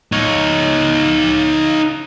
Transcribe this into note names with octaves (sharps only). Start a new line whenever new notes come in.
D#4 C#5